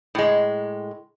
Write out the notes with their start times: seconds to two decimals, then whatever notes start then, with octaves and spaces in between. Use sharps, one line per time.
0.15 A2 G#3